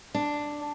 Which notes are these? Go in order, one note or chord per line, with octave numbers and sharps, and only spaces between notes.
D4